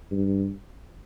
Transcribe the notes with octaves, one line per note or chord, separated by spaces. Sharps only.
G2